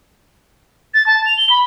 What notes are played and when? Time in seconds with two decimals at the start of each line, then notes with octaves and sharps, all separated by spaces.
0.94 A6
1.06 A5
1.26 F7
1.37 G7
1.50 B5